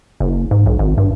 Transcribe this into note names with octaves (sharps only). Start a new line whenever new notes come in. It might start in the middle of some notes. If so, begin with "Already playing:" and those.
F#1
G#2
B1
G#1
G2